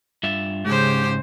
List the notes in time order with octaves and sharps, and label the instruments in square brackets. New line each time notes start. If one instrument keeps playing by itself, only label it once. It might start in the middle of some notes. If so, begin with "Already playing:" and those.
[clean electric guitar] G2 F4 E5
[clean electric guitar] G#2 [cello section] C#3 [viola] G#3 C5 [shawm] G4